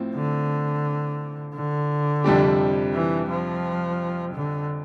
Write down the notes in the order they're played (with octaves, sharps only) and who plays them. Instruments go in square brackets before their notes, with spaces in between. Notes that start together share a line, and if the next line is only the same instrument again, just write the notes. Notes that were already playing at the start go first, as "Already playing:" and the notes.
Already playing: [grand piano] A2 F3 C4
[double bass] D3
D3
[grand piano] F2 C3 G3 D4 G4
[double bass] E3
F3
D3